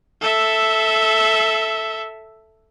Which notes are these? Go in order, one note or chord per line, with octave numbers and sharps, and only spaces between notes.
A4 E5